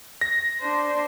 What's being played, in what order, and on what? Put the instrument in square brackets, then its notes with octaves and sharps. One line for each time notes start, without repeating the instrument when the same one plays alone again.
[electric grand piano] A#6
[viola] D4 C5